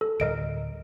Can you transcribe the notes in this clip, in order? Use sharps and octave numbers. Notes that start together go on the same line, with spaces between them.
A4
D2 A2 G3 A#4 D#5 D7